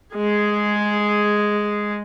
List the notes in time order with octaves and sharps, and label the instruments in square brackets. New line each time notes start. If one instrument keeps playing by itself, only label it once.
[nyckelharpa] G#3 G#4